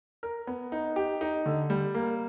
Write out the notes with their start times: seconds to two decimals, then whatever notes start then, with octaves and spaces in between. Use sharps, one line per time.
0.23 A#4
0.47 B3
0.72 D#4
0.96 G4
1.21 D#4
1.46 D3
1.70 G3
1.94 A#3